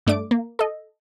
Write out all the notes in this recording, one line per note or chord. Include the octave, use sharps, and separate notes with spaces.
G2 A3 D4 D6 D7
A#3
A4 D#5